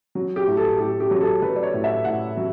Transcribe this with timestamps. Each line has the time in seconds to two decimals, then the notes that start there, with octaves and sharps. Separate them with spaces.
0.15 F#3
0.36 G4
0.47 A2
0.57 A4
0.79 A2 G4
1.00 G4
1.11 F#3
1.21 A4
1.42 F#3 B4
1.56 D5
1.63 C#5
1.74 A2
1.84 E5
2.05 A2 F#5
2.37 F#3